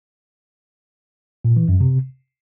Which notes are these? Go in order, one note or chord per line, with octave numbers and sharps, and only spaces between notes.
A#2
E3
F#2
C3